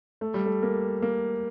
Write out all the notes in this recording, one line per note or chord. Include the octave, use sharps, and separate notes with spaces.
A3
G3
A3
A#3
A#3